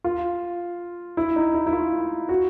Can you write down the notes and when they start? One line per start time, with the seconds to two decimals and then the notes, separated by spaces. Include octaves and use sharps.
0.04 F4
1.17 E4
1.36 D#4
1.54 E4
1.67 E4
1.73 F4
2.29 F#4